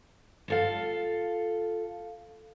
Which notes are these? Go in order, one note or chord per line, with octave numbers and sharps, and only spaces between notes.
F4 A4 F5